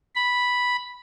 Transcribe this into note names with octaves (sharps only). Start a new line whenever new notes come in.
B5